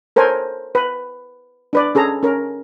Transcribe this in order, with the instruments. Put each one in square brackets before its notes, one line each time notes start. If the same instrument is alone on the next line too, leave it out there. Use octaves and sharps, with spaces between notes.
[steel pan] A4 A#4 C5 C#5 G#5
B4
D4 B4 D5
C#4 G#4 A4 A#5
C#4 A#4